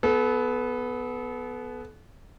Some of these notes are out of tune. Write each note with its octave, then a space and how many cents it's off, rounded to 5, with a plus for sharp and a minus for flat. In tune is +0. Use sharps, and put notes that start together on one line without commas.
B3 +0 A4 -35